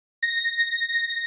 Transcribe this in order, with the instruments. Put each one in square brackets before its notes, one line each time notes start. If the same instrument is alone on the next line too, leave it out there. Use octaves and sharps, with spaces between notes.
[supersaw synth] A#6